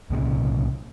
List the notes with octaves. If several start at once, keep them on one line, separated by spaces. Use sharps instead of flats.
C2 A#2 C#3